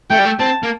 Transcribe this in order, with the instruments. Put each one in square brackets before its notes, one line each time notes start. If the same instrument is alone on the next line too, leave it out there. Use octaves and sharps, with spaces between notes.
[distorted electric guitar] A3 [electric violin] G5
[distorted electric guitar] G3
A3
[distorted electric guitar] C4 [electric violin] A5
[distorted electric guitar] A#3